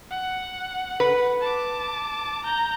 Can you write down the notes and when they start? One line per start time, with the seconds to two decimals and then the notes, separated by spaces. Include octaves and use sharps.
0.11 F#5
1.00 B4
1.41 A5 D6
2.44 A#5 G6